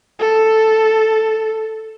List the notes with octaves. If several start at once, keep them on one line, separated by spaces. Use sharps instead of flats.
A4